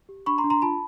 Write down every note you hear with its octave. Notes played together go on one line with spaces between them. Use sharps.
G4
D4 B5 C#6
A#5 C6
D4
A#5 C6
F4 A5 B5